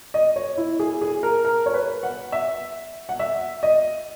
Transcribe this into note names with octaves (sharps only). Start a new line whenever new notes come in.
D#5
C#5
E4
G#4
G#4
A#4
A#4
C#5
B4
F#5
E5
F#5
E5
D#5